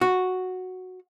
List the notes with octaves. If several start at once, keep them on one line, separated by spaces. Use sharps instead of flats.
F#4